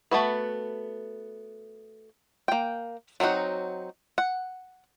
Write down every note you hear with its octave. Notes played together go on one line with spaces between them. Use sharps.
A3 B3 F#4 B4
A#3 G5
F#3 C4 C#4 D#4 F#4
F#5